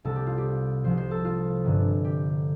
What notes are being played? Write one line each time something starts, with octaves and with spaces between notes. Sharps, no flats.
C2 C3 G3 A4
G4
F4
G4
C2 C3 F3 C4 C5
C5
A4
F4
G1 G2 D3
G4